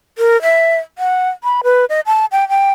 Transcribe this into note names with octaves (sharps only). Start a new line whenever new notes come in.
A#4
E5
F#5
B5
B4
D#5
A5
G5
G5